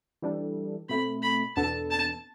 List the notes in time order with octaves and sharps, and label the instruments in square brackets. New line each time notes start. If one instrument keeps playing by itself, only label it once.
[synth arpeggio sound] E3 G3 D4 A4
[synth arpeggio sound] B2 A3 C4 [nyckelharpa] B5
[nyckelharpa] B5
[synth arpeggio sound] E2 B2 B3 D4 A4 [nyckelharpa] A5
[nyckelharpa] A5